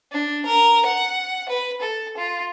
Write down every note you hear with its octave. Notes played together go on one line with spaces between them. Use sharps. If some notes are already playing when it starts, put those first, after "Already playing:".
D4
A#4
F#5
B4
A4
F4